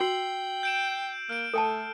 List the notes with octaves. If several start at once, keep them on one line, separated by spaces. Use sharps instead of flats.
F#4 G5 E6 C7 F#7
G6 D7 E7
A#3 F6 D7
A3 A4 G5 A5